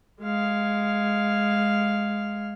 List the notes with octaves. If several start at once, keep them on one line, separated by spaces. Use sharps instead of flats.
G#3 F5